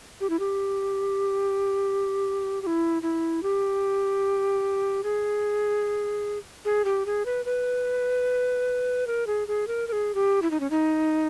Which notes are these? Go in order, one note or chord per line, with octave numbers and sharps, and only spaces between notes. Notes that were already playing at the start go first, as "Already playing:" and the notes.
G4
E4
G4
G4
E4
E4
G4
G#4
G#4
G4
G#4
B4
B4
A#4
G#4
G#4
A#4
A#4
G#4
G4
E4
D#4
C#4
D#4